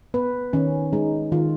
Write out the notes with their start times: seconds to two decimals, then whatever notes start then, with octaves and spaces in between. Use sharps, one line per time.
0.14 B3 B4
0.53 D#3 C#4
0.93 G#3 D#4
1.32 D#3 F4